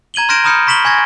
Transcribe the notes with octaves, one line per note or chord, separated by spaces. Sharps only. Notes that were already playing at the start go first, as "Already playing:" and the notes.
A#5 G#6 D#7 F#7 G7
C6 F6 G6 A#6 D7 E7
A#5 B5 D#6 F6 G6 C#7
B5 C#6 B6 E7 F#7 G7
G#5 C#6 G#6 A#6